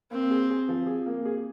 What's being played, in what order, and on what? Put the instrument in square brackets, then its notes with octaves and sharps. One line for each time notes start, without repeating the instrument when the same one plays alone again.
[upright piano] A#3 [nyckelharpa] C4
[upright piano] G#4
G#4
F3
G#4
A#3
G#4